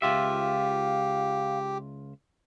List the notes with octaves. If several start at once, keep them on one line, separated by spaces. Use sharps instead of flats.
C#2 F4 G4 E5 F5